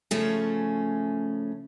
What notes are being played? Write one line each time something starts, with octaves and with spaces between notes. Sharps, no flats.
C#3 F3 A3 C#4